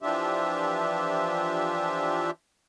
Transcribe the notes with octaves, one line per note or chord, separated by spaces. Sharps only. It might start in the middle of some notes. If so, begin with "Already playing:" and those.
E3 F3 D4 F4 G4 E5